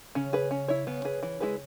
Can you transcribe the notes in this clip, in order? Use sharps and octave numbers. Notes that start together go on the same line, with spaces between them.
C#3 C#4
G#4 B4
C#4
E4 C#5
C#3 B3
G#4 B4
E3
G#3 E4 G#4 B4